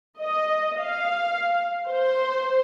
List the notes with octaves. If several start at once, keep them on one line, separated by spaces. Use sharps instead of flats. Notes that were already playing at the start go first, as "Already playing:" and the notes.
D#5
F5
C5